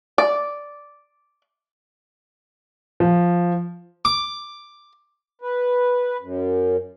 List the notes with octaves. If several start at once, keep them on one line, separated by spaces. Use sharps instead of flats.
D5
F3
D6
B4
F#2